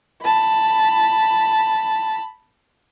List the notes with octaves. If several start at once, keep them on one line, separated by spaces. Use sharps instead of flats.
A5 B5